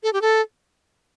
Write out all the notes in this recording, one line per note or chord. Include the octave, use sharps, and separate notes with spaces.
A4
G4
A4